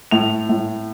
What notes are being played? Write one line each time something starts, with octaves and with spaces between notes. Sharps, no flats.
A2 F7
A2